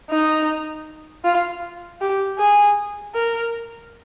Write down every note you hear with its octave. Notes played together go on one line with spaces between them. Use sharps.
D#4
F4
G4
G#4
A#4